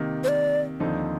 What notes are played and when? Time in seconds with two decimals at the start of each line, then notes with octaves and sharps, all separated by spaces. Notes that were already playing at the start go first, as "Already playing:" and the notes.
Already playing: C3 D#3 A#3
0.24 C5
0.28 D5
0.80 D#2 D3 F3 C4 D#4